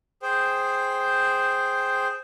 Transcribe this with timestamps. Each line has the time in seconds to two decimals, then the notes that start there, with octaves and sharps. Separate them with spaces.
0.22 G#4 C5 G5